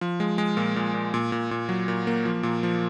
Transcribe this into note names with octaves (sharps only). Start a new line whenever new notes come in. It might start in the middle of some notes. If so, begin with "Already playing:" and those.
F3
G#3
G#3
A#2
A#2
A#2
A#2
A#2
A#2
F#3
A#2
A#3
F3
A#2
F3